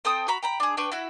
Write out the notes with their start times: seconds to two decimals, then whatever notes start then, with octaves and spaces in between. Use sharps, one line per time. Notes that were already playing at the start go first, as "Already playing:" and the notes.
0.05 C4 A4 G5 D#6
0.28 F#4 A#5 B5
0.42 G5 A#5 B5
0.60 D4 G#4
0.77 D4 B4 G5 C#6
0.92 E4 F#4 E5